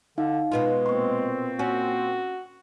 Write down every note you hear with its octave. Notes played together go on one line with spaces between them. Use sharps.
D3 D#4 F5
B2 G#3 B3 F4
A#2 A#3 C4 C6 C#6
C#4 F#4